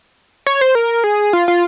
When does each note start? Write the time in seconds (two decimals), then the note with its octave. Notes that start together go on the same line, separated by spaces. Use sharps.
0.46 C#5
0.61 C5
0.75 A#4
1.04 G#4
1.33 F4
1.48 F4